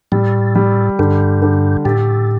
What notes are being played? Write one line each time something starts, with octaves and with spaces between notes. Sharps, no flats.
A2 G3
G3
G2 D3
D3
A2 G4